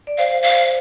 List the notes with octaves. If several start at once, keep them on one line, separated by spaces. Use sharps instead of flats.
D5
C5 F5
F5